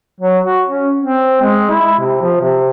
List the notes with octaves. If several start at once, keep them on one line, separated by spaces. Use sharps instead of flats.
F#3
F#4
C#4
C4
G#3
E4
C3
F3
C3